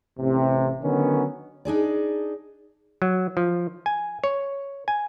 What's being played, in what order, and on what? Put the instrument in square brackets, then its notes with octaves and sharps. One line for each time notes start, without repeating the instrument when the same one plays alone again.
[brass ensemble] A1 C3
D3 D#3 F#3 B3 C#4
[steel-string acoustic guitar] D4 D#4 G#4 D5
[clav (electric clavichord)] F#3
F3
G#5
C#5
G#5